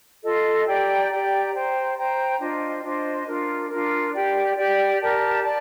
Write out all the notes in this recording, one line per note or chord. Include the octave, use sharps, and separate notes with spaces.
F4 A4 D#5
G4 D5 G5 A#5
G4 D5 G5 A#5
C5 G5 A#5
C5 G5 A#5
D4 F4 C5 D#5
D4 F4 C5 D#5
D4 F4 A#4
D4 F4 A#4
G4 D5 G5
G4 D5 G5
G4 A#4 D5 A5
D5 A5